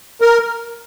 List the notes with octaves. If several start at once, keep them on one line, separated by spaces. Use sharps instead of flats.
A#4